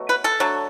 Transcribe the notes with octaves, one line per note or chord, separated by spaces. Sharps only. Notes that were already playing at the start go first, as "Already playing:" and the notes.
Already playing: B2 F#3 A3
B4
A4
D3 F#3 A3